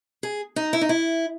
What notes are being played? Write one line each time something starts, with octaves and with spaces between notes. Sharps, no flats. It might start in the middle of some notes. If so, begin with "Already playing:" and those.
G#4
D#4
E4
D#4
E4